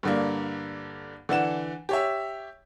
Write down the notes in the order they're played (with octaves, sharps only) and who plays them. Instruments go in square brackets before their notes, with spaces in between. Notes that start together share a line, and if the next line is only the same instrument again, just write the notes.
[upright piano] G2 D3 A#3
D3 E3 F#5 E7
G4 C#5 E5